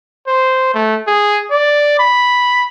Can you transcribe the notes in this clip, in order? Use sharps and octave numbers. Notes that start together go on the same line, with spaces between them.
C5
A3
G#4
D5
B5